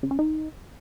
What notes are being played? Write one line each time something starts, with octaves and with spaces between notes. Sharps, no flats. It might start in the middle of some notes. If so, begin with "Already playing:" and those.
C#3
C#4
D#4